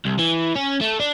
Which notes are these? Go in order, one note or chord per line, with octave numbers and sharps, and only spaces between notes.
C2
E3
C#4
A3
D4